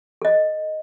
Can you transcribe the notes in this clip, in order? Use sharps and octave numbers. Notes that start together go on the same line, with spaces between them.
A4 D#5